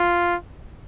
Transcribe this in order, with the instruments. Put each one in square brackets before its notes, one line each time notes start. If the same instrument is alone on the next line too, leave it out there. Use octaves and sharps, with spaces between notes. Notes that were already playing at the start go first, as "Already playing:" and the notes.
Already playing: [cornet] F4